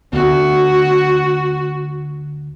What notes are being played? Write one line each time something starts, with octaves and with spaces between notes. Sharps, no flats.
D2 F#4